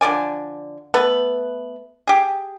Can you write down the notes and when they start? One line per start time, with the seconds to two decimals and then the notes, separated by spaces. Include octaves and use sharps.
0.01 D3 F3 D5 G#5
0.94 A3 B3 B4
2.07 G4 G#4